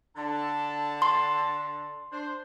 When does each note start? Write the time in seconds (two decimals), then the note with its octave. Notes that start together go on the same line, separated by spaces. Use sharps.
0.17 D3 A5
1.02 C6
2.12 D4 C5